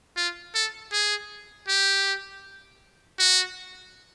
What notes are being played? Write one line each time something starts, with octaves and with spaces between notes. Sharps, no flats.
F4
A4
G#4
G4
F#4